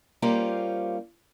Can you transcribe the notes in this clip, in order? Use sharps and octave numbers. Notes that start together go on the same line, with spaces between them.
G3 A#3 C#4 F4 G4 C5